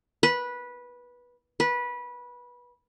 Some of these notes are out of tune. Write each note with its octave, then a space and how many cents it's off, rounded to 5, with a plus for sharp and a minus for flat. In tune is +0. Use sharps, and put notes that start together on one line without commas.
B4 -15
B4 -20